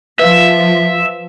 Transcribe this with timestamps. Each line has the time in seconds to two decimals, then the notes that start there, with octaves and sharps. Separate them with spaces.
0.19 F3 B4 E5 F5